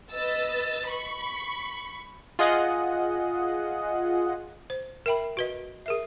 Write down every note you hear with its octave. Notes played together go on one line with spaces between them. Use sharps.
B4 D#5 E6 A6
B5 C#6
F4 G#4 D#5 F#5
C5
A#4 E5 G5 B5
F#4 B4 D#5
G#4 A#4 E5